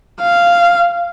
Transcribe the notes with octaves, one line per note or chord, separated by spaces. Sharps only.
F5